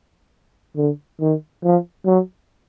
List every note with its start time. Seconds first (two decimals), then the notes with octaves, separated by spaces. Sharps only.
0.76 D3
1.20 D#3
1.64 F3
2.06 F#3